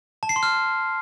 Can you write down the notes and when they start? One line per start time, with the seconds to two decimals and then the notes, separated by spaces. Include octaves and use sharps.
0.23 A5
0.29 C7
0.36 C6
0.43 F6